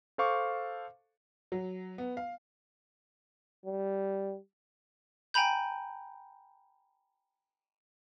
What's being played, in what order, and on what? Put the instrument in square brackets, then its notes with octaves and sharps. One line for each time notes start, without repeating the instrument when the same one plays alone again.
[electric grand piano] A4 C5 F5 C#6 D6
[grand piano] F#3
B3
F5
[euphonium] G3
[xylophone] G5 G#5 A#5 B5 G6